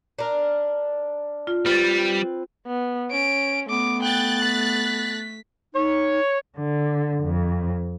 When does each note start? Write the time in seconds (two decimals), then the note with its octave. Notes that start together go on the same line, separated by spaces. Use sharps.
0.19 D4 A#4
1.47 F4
1.66 G3 C4 F4 B4 A6
2.66 B3
3.12 C#4 D7
3.70 A3 B3 D6
4.03 G5 F#6 A6
4.44 B6
5.74 D#4 C#5
6.57 D3
7.24 F2